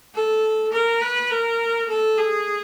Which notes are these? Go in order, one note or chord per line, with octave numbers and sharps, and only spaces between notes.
A4
A#4
B4
A#4
A4
G#4